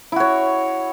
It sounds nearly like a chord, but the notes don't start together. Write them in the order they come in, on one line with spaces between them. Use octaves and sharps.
E4 F#4 C#5